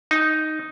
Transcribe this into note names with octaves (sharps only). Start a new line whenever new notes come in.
D#4